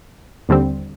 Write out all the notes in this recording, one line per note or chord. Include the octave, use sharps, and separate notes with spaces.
D#2 D3 G3 C4